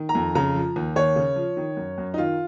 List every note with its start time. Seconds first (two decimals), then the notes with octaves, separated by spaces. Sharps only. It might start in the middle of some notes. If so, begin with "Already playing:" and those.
Already playing: D#3
0.09 A#5
0.15 F2
0.35 C#3 A#5
0.56 F3
0.76 D#2
0.96 D#2 C#5
1.16 C#3
1.36 F3
1.57 D#3
1.77 F#2
1.98 F#2
2.14 D#4
2.18 D#3 F4